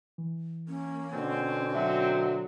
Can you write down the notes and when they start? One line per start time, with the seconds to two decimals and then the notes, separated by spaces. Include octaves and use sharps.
0.18 E3
0.69 A#3 C#4
1.13 B2 D3 C4
1.74 F#3 F#4 E5